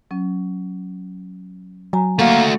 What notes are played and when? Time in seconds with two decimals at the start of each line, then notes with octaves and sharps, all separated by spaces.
0.11 F#3 C#4
1.93 F#3 G#5 A#5
2.19 A3 A#3 F#4